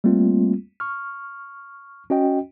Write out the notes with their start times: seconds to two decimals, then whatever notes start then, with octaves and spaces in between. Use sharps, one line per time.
0.04 G3 A3 A#3 C4 F4
0.80 C#6 F6
2.10 C#4 F#4 D#5 G5